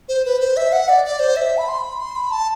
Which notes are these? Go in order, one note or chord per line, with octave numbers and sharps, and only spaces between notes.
C5
B4
C5
E5
F#5
D5
D5
C5
E5
B5
C6
B5
C6
B5
A5